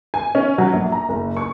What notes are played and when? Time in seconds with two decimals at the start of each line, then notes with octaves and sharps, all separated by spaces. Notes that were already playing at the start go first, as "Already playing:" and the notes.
0.14 G#5
0.35 C#4
0.58 F#3
0.73 A#1
0.92 A#5
1.09 F#1
1.37 C#6